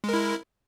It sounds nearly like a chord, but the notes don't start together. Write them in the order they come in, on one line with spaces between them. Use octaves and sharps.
G#3 A#4 E4